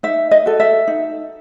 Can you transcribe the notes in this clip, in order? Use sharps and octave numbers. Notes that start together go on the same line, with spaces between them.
D#4 E5
D#5
F#4 A4
E5
D#4